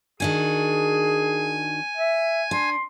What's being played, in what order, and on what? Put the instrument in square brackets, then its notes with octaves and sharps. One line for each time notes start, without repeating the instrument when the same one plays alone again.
[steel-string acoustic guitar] D#3 D4 F#4 [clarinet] G#4 [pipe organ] G#5 G#6
[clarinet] E5
[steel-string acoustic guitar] D4 [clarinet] C6